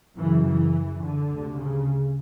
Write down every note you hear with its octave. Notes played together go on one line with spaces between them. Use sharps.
F#2 C#3 E3
E3
D3
D2 C3
C#3